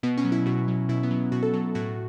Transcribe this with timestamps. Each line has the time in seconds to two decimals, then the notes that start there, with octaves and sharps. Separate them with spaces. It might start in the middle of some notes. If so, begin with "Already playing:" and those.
0.03 B2 B3
0.18 C#4
0.25 F#3
0.32 E4
0.46 B2 F#4
0.68 F#3
0.89 B2 E4
1.03 B3
1.11 F#3
1.32 B2 F#4
1.43 A4
1.53 F#3 A4
1.75 A2 F#4